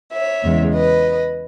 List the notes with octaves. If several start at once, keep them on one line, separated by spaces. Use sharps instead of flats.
C#5 E5
E2 C#3 G#3
B4 D#5